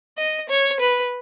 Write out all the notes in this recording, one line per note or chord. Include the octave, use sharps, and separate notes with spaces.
D#5
C#5
B4